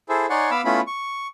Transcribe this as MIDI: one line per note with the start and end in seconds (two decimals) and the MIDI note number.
0.09 0.26 64
0.09 0.26 68
0.09 0.26 69
0.09 0.26 72
0.30 0.50 63
0.30 0.50 73
0.30 0.50 74
0.30 0.50 78
0.30 0.50 80
0.30 0.50 84
0.51 0.61 59
0.51 0.61 77
0.51 0.61 83
0.51 0.61 86
0.51 0.61 88
0.65 0.81 57
0.65 0.81 59
0.65 0.81 61
0.65 0.81 64
0.65 0.81 65
0.65 0.81 83
0.87 1.27 85